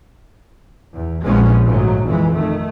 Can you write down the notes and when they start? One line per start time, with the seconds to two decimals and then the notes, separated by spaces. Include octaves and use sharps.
0.93 E2
1.24 A#1 A#2 F3 G#3 B3 C#4
1.65 G1 G#2 F#3 A3
2.04 F2 E3 G#3
2.32 D#3 A3